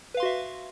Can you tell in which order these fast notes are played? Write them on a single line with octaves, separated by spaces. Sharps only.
B4 F5 C6 F#4 E5